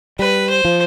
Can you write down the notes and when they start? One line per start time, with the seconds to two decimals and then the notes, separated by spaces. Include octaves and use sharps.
0.19 G3 B4
0.49 C5
0.65 F3